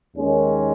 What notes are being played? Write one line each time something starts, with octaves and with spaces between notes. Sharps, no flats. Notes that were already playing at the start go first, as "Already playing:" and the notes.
D#2 D#3 G#3 C#4